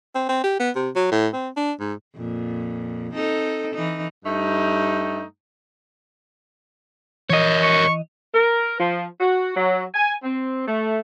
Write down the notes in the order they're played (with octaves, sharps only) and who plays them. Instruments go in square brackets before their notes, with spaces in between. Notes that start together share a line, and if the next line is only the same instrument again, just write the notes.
[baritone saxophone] C4
C4
G4
B3
C3
F#3
A2
C4
D4
G#2
[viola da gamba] F2 A#2
C4 D#4 A4
E3 D#4
[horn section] G2 G3 A3 D#4
[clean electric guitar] E3 D#5 [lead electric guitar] A#4 C#5
[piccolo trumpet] C#6
[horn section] A#4
F3
F#4
F#3
G#5
C4
A3